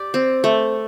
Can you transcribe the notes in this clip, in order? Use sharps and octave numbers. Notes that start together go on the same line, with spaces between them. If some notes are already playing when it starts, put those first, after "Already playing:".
Already playing: G4 D5
C4
A3